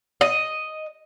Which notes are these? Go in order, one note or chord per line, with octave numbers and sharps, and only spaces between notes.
D#5